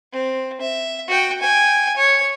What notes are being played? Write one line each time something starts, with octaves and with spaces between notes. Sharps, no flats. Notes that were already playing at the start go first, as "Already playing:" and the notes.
C4
E5
F#4 G5
G5 G#5
C#5